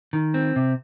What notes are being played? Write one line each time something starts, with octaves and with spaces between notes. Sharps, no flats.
D#3
C4
C3